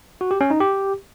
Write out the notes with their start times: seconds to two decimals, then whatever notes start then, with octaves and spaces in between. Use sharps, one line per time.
0.21 F#4
0.31 G4
0.41 C#4
0.50 D#4
0.60 G4